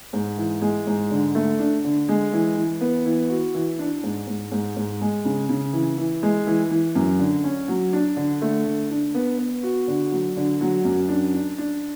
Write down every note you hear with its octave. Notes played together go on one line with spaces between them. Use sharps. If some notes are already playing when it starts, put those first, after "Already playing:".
G#2
E3
G#3
G#2
D3
A3
D4
D3
G#3
E3
E3
B3
E3
F#4
E3
D4
G#2
G#2
G#2
G#2
G#3
C#3
C#3
E3
E3
G#3
E3
E3
F#2
D3
C#4
F#3
D4
D3
A3
D3
D4
B3
B3
F#4
D3
F#3
D3
F#3
F#2
D4
D4
D4